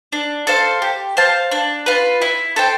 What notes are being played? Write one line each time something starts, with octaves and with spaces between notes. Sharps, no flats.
D4
A4 C5 F5
G4
C5 F5 A5
D4
F4 B4
E4
A4 C5 G5